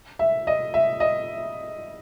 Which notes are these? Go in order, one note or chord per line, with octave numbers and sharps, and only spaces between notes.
E5
D#5
E5
D#5